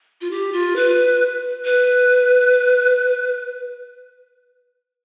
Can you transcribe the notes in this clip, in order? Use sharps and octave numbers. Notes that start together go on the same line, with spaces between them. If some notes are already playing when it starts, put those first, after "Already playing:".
F4
G4
F4
B4
B4